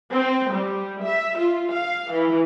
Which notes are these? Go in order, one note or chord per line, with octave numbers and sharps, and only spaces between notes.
C4
G3
E5
F4
F5
E3